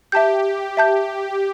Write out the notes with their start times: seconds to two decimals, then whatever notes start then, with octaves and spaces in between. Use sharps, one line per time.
0.12 G4 E5 A5 G6
0.77 E5 A5 G6